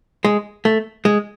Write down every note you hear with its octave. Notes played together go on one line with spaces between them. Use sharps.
G#3
A3
G#3